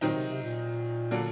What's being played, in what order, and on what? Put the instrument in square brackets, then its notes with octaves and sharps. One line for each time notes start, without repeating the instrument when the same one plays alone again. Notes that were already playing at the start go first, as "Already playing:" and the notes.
[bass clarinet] A#2 [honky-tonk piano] D#3 F#3 C4 D#4
[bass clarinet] C3
C3
A#2
[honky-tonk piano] D3 F#3 A#3 D4